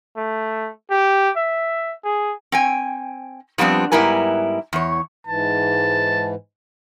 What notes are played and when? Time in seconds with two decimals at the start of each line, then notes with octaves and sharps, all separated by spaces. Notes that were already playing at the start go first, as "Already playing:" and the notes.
0.17 A3
0.91 G4
1.37 E5
2.04 G#4
2.52 C4 G5 G#5
3.58 F3 G3 B3 C4 D4
3.92 G#2 G3 B3 E4 A#4 G#5
4.73 E2 C#5
5.27 G#2 E3 A5